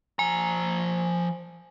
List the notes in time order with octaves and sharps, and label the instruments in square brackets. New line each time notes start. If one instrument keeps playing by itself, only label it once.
[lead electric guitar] F3 A#5 [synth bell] G#5